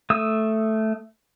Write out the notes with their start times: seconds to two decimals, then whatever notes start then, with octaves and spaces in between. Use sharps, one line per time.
0.10 A3 D#6 E6